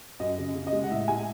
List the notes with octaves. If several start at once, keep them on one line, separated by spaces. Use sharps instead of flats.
F#2 D#5
C#3
C#3
D#5
G#3
F#5
A2 E5
G#3 G#5